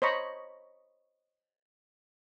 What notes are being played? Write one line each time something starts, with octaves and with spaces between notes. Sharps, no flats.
C5 C#5 D#5 A#5 B5 C#6